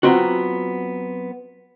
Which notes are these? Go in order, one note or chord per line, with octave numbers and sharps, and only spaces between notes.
F#3 G#3 B3 C4 F4 F#4